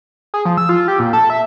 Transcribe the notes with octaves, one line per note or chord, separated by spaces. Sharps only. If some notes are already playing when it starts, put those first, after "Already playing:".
G#4
F3
E6
F4
G4
A#2
A4
E5